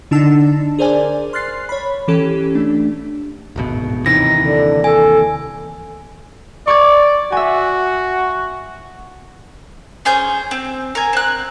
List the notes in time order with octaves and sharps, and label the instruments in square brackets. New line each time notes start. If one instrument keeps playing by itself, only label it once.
[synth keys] D3 D4 D#4 A5 E6
G#4 A#4 C5 D5 G#5
C6 F6 F#6 A6 C7
C#5 B5
E3 C#4 G4 A4
A3 D4
[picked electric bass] D1 G#1 B2
[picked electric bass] D#2 C3 E3 [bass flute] D#4 [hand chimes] A#6
[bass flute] D3
[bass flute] A4 [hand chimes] G#5
[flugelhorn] D5 [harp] C#6 D6 G#6
[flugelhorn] F#4 [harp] E5 G#5
[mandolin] C#4 G#4 C5 G6
C4
A#4 G#5
C4 F#6